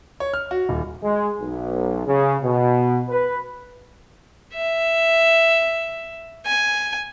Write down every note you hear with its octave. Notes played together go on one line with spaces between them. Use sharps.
C#5
F6
F#4
D#1
G#3
B1
C#3
B2
B4
E5
G#5